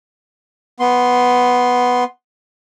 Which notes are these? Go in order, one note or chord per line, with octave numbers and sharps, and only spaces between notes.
B3 C6